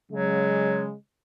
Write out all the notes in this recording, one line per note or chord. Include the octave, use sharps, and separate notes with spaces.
C#3 F#3 G#3